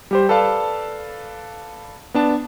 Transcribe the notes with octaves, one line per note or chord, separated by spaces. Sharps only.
G3 G4 C5
A4 B4 D5 F5 A5
B3 D4 A5